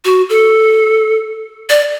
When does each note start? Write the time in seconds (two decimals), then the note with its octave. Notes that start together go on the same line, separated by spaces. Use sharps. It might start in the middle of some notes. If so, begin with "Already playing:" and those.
0.05 F#4
0.30 A4
1.70 D5